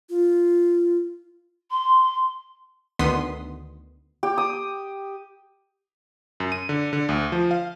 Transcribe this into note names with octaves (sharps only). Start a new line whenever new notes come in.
F4
C6
D2 D#3 B3 C6 D#6 B6
G4
D#6
F#2
D#7
D3
D3
D2
F3
F5